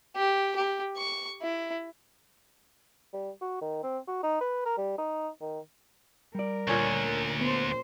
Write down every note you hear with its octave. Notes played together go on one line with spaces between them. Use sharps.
G4
G4
C#6
E4
G3
F#4
D#3
C4
F#4
D#4
B4
A#4
G3
D#4
D#3
G3 A#4 D5
D2 A#2 D3 C#4 C#5
B3 C5